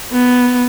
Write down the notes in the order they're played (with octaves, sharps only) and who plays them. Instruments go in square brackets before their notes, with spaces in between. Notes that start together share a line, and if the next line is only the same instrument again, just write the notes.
[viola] B3